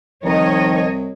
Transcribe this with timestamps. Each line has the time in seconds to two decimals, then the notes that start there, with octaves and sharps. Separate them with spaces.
0.25 C2 D#3 F3 C#5 D#5